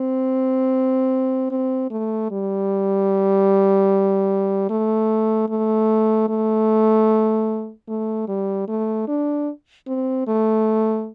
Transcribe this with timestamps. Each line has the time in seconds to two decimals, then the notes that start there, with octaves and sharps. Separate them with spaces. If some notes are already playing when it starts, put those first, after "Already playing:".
Already playing: C4
1.51 C4
1.90 A3
2.31 G3
4.70 A3
5.49 A3
6.29 A3
7.88 A3
8.28 G3
8.68 A3
9.08 D4
9.87 C4
10.27 A3